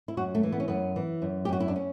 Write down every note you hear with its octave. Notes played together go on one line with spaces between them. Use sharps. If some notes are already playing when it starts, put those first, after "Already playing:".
E4
F#2 F#4
A3
E3
B3
C#4
F#2 B3
E3
F#2
G4
F#2 F#4
E4
D4
C#4